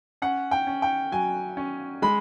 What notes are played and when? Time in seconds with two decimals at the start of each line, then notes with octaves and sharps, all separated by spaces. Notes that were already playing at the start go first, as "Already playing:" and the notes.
0.22 C#4 F#5
0.51 G5
0.67 C#4
0.82 G5
1.12 F#3 G#5
1.57 C#4
2.02 G#3 B5